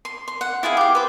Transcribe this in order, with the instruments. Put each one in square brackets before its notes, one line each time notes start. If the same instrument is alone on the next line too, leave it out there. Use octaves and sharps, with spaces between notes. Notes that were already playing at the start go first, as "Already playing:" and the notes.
[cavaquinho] C6
C6
F#5
E4 F4 G#4 F5
G4 F5
B4 C5